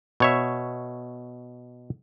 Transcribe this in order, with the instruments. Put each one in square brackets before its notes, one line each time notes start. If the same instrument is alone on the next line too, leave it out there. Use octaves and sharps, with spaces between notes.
[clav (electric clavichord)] B2 C#5 E5